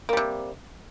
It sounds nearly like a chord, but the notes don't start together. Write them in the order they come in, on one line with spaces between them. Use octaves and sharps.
A#3 G3 C3